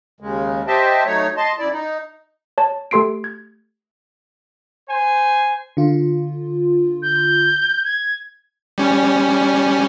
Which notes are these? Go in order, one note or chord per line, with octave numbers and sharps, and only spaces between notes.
D#2 C#3 G#3
G4 C5 D#5 E5 G5 A5
F#3 A3 D#4 C#5
D#5 A5 C6
F#2 E4 D5
D#4
C#5 A5
A3 G4 A4 C6 C7 D7
G#6
C5 G#5
D3 F4
G6
G#6
G3 C#4